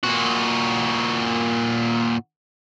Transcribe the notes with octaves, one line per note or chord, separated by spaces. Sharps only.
A#2 F#4